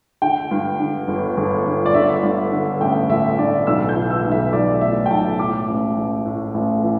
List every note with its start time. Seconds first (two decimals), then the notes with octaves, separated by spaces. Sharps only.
0.22 D3 G5
0.51 G2
0.79 D3
1.08 G1
1.37 G1
1.66 G1
1.86 D5
1.94 D3 E5
2.23 G2
2.52 D3
2.81 A1 G5
3.09 A1 E5
3.38 D3 D5
3.67 B1 E6
3.89 G6
3.95 E3
4.10 E6
4.24 B1
4.31 E5
4.53 B1 D5
4.81 A2 E5
5.06 G5
5.10 B1 A5
5.39 A2 D6
5.68 A1
5.97 A1
6.26 A2
6.54 A1
6.83 E3